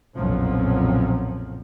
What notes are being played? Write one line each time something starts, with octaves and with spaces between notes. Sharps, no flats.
F#1 B1 F2 A#2 F3 F#3